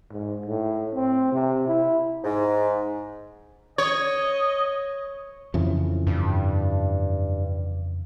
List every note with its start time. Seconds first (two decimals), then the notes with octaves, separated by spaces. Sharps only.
0.12 G#2
0.46 A2
0.95 C4
1.32 C3
1.68 E4
2.24 G#2
3.78 C#5 D#5
5.54 F2 C#3 E3
6.07 G2